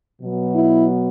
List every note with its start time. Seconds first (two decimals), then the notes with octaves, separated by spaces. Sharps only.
0.21 B2 F#3 B3
0.53 E4